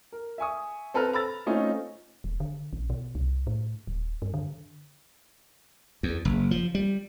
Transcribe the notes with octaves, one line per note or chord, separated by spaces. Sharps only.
A#4
E5 G#5 C#6 D#6
C4 A4 B4 A#5 F6
A#5 B5 E6 A6
A3 C4 C#4 D#4 F4 D#5
E1
D3
A#1
B2
C2
A2
D#1
G2
D3
E2
F#1
F3
G3